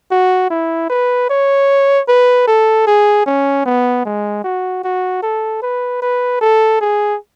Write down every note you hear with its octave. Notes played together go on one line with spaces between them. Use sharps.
F#4
E4
B4
C#5
B4
A4
G#4
C#4
B3
G#3
F#4
F#4
A4
B4
B4
A4
G#4